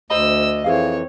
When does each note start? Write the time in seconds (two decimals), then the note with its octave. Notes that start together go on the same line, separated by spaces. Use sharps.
0.10 D2 C5 D#5 A#5 B5 E6
0.64 F2 E3 C4 E4 G#4 C#5 F5